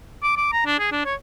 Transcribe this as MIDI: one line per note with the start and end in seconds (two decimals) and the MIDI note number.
0.23 0.35 86
0.37 0.50 86
0.52 0.63 82
0.66 0.77 62
0.79 0.90 68
0.91 1.02 62
1.05 1.15 73